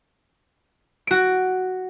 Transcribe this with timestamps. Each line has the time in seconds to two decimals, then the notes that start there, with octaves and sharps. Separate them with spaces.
1.07 F#4 D7